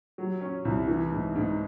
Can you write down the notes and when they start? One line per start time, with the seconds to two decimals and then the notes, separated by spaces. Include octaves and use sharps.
0.18 F#3
0.41 C#4
0.65 C2
0.88 E3
1.12 G#2
1.36 G#2